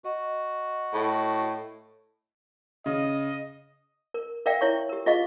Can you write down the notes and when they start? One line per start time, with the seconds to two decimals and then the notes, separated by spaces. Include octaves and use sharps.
0.05 F#4 D#5
0.93 A2
2.86 C#3 D#5
4.14 A#4
4.46 A#4 D5 E5 F5 G5
4.61 E4 C#5 C#6
4.89 G4 A#4
5.06 F4 G#4 D#5 F5 C#6